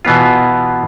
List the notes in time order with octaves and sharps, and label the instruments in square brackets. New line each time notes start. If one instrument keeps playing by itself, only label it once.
[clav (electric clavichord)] B2 E3 B3 F4